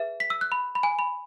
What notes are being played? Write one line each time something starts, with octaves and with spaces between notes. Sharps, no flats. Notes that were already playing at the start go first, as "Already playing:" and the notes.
Already playing: G#4 B4 E5
B6
E6
F#6
B5
B5
G#5
B5